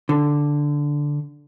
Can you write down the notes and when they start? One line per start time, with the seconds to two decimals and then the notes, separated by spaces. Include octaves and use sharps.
0.09 D3